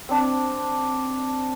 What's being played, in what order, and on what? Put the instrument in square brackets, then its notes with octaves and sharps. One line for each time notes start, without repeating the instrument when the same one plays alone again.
[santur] C4 D4